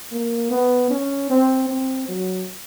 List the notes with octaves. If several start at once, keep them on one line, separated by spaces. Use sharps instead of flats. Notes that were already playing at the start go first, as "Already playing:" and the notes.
A#3
B3
C#4
C4
C4
F#3